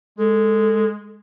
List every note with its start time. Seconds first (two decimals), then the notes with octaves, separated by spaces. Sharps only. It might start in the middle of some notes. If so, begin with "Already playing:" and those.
0.18 G#3 A4